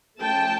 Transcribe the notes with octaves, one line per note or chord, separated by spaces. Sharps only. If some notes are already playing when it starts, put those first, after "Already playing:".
F3 A3 C#4 G5 A5